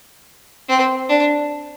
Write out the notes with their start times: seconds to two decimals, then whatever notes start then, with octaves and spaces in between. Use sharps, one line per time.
0.69 C4
1.09 D4